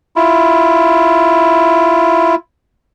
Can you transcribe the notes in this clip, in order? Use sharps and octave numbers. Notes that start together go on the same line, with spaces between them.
E4 F4